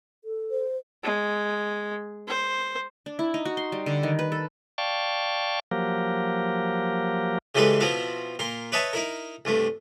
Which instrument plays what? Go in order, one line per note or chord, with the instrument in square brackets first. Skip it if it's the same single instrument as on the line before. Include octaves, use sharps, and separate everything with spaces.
[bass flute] A4
[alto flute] C5
[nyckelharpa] G#3
C5
[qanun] D4
E4
D#4
F#4
C6
G3
D3
D#3
B4
A4
[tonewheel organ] D5 F5 G5 A5 C#6
F3 F#3 A#3 G4 A#4
[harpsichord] C#3 E3 G3 G#3 A4 B4
B2 F3 C4 E4 F5
A#2 A#4 C6
B4 C#5 D#5 E5 A5 C#6
D#4 E4 A#4
C2 G2 A3